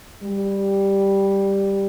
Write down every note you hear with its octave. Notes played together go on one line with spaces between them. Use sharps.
G3